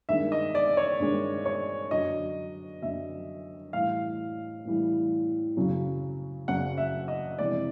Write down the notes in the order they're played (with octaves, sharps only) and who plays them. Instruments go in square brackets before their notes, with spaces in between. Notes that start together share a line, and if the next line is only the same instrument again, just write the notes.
[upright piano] G2 D#3 G#3 E5
D#5
D5
C#5
G2 D#3 G#3
C#5
F#2 D3 F#3 D#5
F#2 D3 F#3 E5
A2 E3 G3 F5
A2 E3 G3
F#2 C#3 F#3
F#2 C#3 F#3 F#5
E5
D#5
F2 C3 E3 G#3 D5